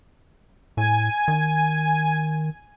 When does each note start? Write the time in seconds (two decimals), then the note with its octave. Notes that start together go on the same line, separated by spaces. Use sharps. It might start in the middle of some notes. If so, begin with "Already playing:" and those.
0.77 A2 G#5
1.28 D#3